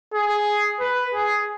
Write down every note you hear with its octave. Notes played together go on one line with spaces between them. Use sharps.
G#4
B4
G#4